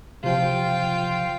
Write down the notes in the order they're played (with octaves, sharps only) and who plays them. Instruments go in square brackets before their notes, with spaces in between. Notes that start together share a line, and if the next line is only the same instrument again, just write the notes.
[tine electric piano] C3 F3 [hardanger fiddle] F4 G5